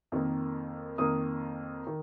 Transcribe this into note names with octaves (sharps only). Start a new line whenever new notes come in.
F2 D#3 A#3
F2 D#3 A#3 D#6
D#3